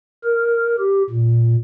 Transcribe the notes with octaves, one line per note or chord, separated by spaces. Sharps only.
A#4
G4
A#2